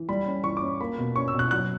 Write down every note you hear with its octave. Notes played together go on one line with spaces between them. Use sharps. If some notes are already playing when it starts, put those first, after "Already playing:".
Already playing: E3
G3 B5
C#4
E3 C#6
D6
C#4
A#3 B5
B2
C#4 C#6
E6
B2
F#6
F#3 F#6